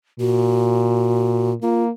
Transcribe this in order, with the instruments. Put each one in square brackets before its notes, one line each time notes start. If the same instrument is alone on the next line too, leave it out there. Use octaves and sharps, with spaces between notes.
[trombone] A#2 [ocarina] F#4
[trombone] A#3 [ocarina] F4